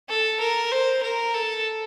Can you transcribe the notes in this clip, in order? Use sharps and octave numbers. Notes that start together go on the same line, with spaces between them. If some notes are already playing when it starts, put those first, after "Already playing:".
A4
A#4
C5
A#4
A4